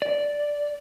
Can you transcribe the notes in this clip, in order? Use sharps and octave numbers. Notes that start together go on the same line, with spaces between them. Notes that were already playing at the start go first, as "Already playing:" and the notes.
D5